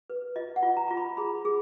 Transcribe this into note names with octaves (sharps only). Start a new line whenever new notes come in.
B4
F4 D#5
F#5
F4
A#5
F4 A#5
B5
G#4 B5
G#4